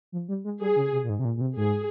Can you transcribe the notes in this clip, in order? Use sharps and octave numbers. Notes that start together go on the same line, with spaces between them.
F3
G3
G#3
G3 G#4
C#3
C3
A#2
G#2
C3
A#2
A#2
C3
G#2 G#4